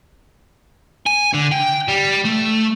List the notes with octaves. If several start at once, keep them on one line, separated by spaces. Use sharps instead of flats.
G#5
D3
G5
G3
A3